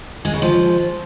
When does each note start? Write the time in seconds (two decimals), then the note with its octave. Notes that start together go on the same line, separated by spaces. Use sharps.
0.25 G#3
0.33 C#3
0.42 F3